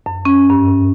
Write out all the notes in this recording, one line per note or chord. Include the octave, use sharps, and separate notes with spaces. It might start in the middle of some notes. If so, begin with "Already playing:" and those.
F#2
C#4
G2